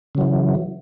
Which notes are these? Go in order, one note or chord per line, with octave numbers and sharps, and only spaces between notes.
C#3 E3 F#3